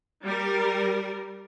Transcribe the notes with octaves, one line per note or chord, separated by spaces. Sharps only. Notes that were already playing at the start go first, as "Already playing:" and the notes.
G3 A#4